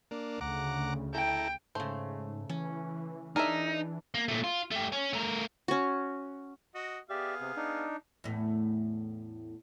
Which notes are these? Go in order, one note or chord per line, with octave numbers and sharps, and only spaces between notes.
A#3 D4
D2 C#3 F#5 A#5 D6
E4 A4 G5 A#5
G#2 C#3 A3 C5
E3 C#4
D4 D#4 G#4 A#4 E5
A#3
A#2 A3
F4
A3 G4
C#4
A3 A#4
C#4 F#4
F#4 D#5
B3 G4 G#4 D5 E5 F5
C3
D4 D#4
E2 A2